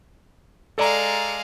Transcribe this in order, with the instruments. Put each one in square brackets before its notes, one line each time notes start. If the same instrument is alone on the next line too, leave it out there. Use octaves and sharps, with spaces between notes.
[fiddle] G#3 F5 [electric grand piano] A4 D5 A#5